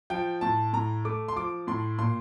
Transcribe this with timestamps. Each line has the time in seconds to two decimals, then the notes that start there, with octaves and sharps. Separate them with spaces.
0.10 F3 G5
0.41 A2 A5
0.73 A2 A#5
1.05 A3 D6
1.28 C6
1.36 F3 D6
1.67 A2 C6
1.99 A#2 C6